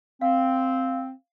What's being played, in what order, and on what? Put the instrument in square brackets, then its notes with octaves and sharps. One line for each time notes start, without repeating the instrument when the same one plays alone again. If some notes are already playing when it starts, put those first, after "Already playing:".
[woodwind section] C4 [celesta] F5